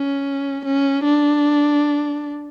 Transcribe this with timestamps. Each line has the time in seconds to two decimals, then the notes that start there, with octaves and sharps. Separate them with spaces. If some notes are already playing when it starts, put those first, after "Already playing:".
Already playing: C#4
0.65 C#4
1.05 D4